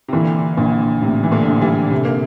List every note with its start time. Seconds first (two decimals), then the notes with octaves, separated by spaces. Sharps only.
0.08 C3
0.13 A#2 D3 E3
0.57 A#1 A#2
1.02 A2 C3
1.23 E3
1.32 A#2 D3
1.47 A#1
1.61 E3 G3
1.91 C3 A3
2.05 A#3